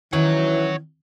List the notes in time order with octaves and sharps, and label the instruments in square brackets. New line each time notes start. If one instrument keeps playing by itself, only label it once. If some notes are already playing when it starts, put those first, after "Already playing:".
[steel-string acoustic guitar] D#3 C#4 D#4 [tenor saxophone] E3 [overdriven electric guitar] C#5 F#5